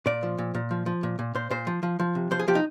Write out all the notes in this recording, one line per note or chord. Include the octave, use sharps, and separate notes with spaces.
A#2 D5
F3
A#2
A#2
F3
F3
A#2
A#2
A#2 C5
A#2 C5
F3
F3
F3
C3
F3 C5
G#4
F3 G4
D#4